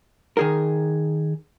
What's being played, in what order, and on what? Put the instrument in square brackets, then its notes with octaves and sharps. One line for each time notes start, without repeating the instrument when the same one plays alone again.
[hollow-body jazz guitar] D#3 G#4 A#4